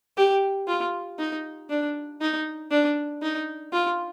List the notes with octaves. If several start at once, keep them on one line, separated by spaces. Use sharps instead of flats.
G4
F4
D#4
D4
D#4
D4
D#4
F4